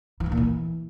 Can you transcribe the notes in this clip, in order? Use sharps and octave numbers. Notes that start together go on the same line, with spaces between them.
E3
G#2
A#2
E3